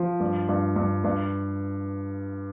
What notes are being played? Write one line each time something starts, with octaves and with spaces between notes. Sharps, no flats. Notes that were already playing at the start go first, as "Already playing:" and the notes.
Already playing: F3
G2
G2
G2
G2